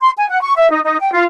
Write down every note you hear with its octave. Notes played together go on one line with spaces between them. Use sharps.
C6
G#5
F#5
C#6
E5
D#4
D#4
G5
F4